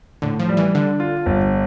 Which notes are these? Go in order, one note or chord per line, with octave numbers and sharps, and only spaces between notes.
A2 D3
F3
G3
E3
D3 D4
F4
G1